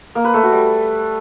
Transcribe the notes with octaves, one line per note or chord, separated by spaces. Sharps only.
A#3
B4
A3
F#4
G3